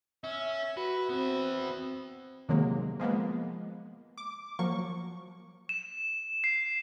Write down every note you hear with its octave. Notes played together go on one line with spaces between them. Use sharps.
C#4 E5
F#4 B4
B3 C4 E4
C3 D#3 F#3 G#3 A#3
F3 G#3 A#3 B3
D6
F3 F#3 A#3 C#6
E7
C7